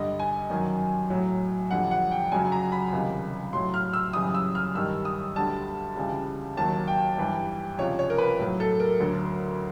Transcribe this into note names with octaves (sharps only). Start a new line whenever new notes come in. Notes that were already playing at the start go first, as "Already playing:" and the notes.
Already playing: G2 D3 G3 D#5
G#5
F#2 D#3 F#3
A2 F#3
F2 D3 G3 F#5
F#5
G5
F#2 C#3 F#3 G#5
A#5
B5
C#2 C3 D#3 G3
A2 F#3 C6
F6
E6
F#2 C#3 E3 G3 D#6
E6
F6
G2 D#3 G3 E6
D#6
D2 D3 G3 A5
C#2 C#3 E3 G3
D#2 D#3 F#3 A5
G5
G2 E3 G3
C#2 C3 F3 C#5
C#5
A#4
B4
A2 F#3
A4
A#4
D2 D3 F#3